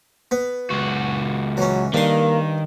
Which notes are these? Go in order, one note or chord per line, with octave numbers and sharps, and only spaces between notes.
B3
C#2 F#4
E3 F#3 C#4
G2 D#3 A#3 C6